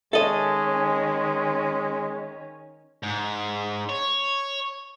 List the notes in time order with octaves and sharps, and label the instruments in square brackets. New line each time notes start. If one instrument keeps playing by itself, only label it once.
[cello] D#3 C#4 [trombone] G#3 [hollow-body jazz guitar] A4 D#5 [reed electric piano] E5
[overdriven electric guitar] G#2
C#5